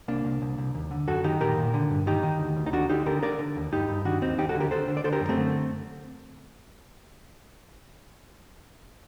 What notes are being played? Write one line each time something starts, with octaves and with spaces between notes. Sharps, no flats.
C2 A#3 D4
C2
C2
C2
D#2
D3
F#2 F#4 A4
D#3 D#4 G4
A#2 G4 A#4
A#2
D3
G2
D#3 D#4 G4
D#3
D2
D2
D#4
D3 D4 F#4
D3 D#4 G4
D3 G4 A#4
D3 A#4 D5
D3
D#2
G2 D#4 G4
G2
D#3 D4 F#4
D#2 C4 D#4
D#2 D#4 G4
F#4 A4
D3
G4 A#4
D3 A4 C5
D3
D5
D3 A4 C5
G4 A#4
F#2
A3 C4
D3